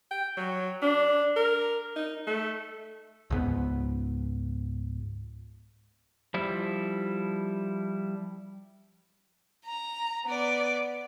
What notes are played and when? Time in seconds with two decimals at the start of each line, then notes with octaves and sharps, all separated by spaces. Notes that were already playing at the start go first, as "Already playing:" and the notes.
0.11 G5
0.37 F#3
0.82 D4
1.36 A#4
1.96 D#4
2.27 A3
3.30 C#2 G#2 B3
6.34 F3 G3 E4
9.66 A#5
10.25 B3 D5